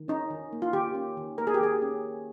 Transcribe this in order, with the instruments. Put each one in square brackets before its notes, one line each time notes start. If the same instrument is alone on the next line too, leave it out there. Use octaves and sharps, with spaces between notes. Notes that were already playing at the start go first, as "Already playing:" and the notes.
Already playing: [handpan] D#3
[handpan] C#4 [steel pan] D#4
[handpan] D#3
A#3
[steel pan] F4
[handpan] D#3 [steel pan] G4
[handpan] C#4
D#3
[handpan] A#3 [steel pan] A#4
[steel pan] G#4
G4
[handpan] D#3 [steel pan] G#4
[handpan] C#4